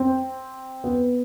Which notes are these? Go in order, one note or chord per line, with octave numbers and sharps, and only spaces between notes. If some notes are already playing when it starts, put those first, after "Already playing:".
Already playing: C4
B3